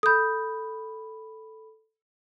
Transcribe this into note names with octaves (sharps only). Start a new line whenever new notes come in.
A4 B5 D#6 G6